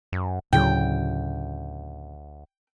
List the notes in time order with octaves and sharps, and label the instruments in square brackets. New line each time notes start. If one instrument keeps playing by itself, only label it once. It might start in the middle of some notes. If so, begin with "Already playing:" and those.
[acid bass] F#2
[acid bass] D2 [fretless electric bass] A2 C#3 F#3 [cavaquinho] G5